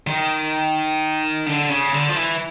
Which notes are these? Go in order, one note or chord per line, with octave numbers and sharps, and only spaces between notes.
D#3
D3
C#3
D3
F3
E3